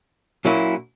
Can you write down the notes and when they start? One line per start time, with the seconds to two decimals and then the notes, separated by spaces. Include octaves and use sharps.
0.45 A#2 F#3 A#3 C#4 E4